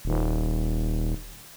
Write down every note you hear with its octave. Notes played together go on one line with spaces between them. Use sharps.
D#1